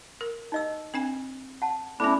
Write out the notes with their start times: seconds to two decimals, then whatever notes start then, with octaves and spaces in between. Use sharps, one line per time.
0.21 A#4
0.52 D#4 D#5 E6
0.94 C4 D4 G#5
1.62 F#5 A5
2.00 A3 B3 C#4 D4 E4 B5